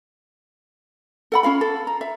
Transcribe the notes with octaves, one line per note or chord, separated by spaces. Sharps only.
A4 F#5 B5
C#4 F4 F5 B5
A4
A#5
E5